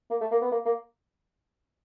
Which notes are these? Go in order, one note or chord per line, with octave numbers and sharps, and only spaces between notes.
A#3
A3
A#3
B3
A#3
A#3